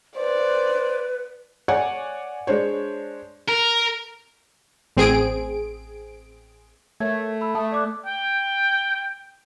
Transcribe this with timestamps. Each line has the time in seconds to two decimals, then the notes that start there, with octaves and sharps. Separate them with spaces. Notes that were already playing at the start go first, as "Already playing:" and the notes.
0.17 B4 C5 D5
1.68 C#5 D5 F#5 G#5
2.47 G#3 D4 C5 C#5
3.48 A#4
4.97 A1 C4 G#4 D7
7.00 A3 A#4 C#5 G#6
7.41 B5 E6
7.55 A3 A5 D#6
7.72 D5 D6 F#6
8.06 G5